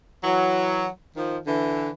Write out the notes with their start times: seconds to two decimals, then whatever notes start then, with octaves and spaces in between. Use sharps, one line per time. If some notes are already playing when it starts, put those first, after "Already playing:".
0.24 E3 F#3
1.16 D#3 F3
1.47 D3 E3